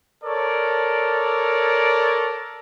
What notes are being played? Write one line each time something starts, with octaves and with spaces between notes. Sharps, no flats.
A4 A#4 C#5 D5